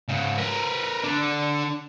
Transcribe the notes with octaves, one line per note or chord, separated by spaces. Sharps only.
G#2 C#3
A#4 B4
D3 D4